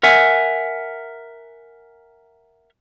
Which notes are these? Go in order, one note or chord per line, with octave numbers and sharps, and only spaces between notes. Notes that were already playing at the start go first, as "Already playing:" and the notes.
A#4 E5 F#5 G#5